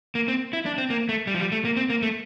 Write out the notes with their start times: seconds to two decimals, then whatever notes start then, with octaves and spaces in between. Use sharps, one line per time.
0.15 A#3
0.28 C4
0.53 E4
0.66 D4
0.78 C4
0.90 A#3
1.09 A3
1.27 G3
1.34 F3
1.40 G3
1.52 A3
1.65 A#3
1.77 C4
1.90 A#3
2.02 A3